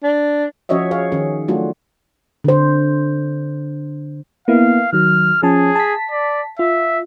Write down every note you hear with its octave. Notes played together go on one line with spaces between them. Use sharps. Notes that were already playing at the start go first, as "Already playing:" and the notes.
D4
F3 C#4 F#4 C#5 D#5 E5
G#4 C#5 F5
D#3 C#4 G#4
F#3 A3 D4 F4 F#4
D3 C5
A#3 B3 E4 F5
D#3 F#3 F6
F3 C#4 G#4 A5
A5 B6
D5
F4 E5